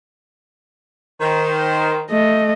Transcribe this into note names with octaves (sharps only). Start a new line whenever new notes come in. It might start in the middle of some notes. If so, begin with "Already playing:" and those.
D#3 C5
A3 D#5